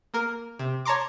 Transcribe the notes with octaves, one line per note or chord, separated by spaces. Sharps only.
A#3 A#4
C3
C#5 A5 A#5 C6 D6